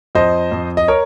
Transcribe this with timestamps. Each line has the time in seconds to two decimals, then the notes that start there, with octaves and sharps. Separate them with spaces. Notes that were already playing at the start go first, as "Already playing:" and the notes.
0.15 F2 C5 D#5
0.52 F2
0.77 D#5
0.88 A#4 C#5